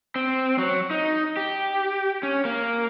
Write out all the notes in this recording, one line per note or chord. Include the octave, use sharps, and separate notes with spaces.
C4
F#3
D#4
G4
C#4
A#3